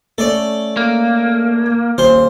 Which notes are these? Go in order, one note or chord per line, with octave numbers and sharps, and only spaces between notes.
A3 C#4 A4 D5
A#3
D#1 A#2 C5 G7